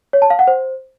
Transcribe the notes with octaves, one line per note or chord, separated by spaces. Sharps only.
C#5
A5
F5
F#5
C5